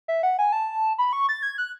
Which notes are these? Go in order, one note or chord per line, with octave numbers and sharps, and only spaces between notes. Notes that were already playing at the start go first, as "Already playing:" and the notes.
E5
F#5
G#5
A5
B5
C#6
A6
G#6
F#6